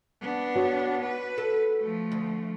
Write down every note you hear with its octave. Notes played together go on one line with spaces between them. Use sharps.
B3 D4
F#4 C#5
B4
A4
F3 A3
D2